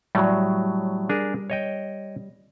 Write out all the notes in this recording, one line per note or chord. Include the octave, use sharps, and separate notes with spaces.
A2 F#3 G3
D4 G#4 A#4
C#5 D#5 G5